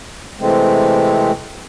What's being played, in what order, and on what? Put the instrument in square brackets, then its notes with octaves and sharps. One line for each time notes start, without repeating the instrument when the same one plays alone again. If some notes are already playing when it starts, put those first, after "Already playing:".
[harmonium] C3 E3 G#3 A3 C4